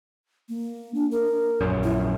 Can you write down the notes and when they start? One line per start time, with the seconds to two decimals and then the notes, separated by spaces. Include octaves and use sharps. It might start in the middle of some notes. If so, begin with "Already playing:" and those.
0.49 A#3
0.94 D4
1.11 A#4
1.61 A#1 F#2
1.83 E4